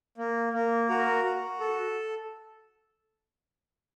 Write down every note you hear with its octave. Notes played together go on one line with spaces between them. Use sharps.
A#3
A#3
F#4 A#4
F#4
A4